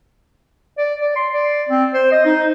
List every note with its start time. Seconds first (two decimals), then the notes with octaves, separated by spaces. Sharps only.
0.78 D5
1.01 D5
1.16 C6
1.33 D5
1.69 C4
1.94 C5
2.12 D#5
2.25 D#4